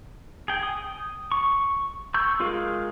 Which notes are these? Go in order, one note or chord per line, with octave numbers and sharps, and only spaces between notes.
G#4 G5
D#6
C#6
C#6 E6 G6
G#3 F4 G#4 A#4 F5